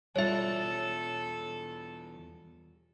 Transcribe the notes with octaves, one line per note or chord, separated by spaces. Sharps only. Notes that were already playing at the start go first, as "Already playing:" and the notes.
E2 B2 G3 F4 A4 C#5 E5